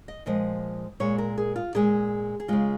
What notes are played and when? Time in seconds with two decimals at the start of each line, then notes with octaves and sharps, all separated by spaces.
0.08 D#5
0.26 A#2 F3 G#3 D#5
1.00 A#2 G#3 C#5
1.18 A#4
1.38 G#4
1.56 F4
1.75 A#2 G#3 G#4
2.40 G#4
2.48 C#3 G#3 F4